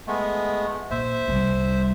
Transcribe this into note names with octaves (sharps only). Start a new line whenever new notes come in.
G#3 A3 B3
A#2 C5 E5
C2 G3